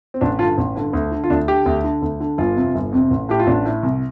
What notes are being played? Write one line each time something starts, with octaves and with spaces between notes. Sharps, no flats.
C4
A1 D4
G2 D3 F4
A1
G2 D3
D2
D3
F4
D2 D4
D3 G4
D2
D3
D2
D3
G1 F4
F2 C3
G1
F2 C3
A1
A2 G4
F4
A1 D4
A2
C2